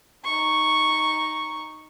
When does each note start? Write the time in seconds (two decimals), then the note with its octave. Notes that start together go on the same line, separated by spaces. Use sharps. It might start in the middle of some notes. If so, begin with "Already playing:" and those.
0.24 D#4 C#6